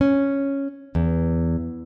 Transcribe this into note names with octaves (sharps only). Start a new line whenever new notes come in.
C#4
E2